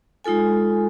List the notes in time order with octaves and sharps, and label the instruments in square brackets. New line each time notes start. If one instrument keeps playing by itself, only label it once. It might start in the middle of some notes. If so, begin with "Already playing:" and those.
[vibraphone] G#3 D#4 F4 A4 G#5